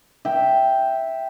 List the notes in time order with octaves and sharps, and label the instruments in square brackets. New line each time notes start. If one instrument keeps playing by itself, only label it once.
[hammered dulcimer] E5 G5